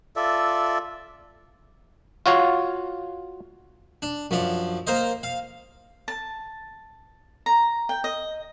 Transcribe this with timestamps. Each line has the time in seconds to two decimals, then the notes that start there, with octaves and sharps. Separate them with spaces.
0.16 F4 A4 D5 E5
2.26 F4 F#4 C#5 F5
4.02 D4
4.31 F#2 F3 D4
4.87 A#3 A#4 C5 D#5
5.23 F5
6.08 A5
7.46 A#5
7.89 G5
8.04 D#5